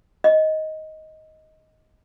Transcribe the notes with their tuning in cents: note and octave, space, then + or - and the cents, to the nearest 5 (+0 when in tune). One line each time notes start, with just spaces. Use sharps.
D#5 +10